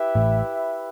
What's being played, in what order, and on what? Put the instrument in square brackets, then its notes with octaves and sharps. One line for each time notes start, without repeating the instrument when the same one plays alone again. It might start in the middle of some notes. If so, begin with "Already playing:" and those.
Already playing: [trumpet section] E4 G4 B4 E5
[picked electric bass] A1 A2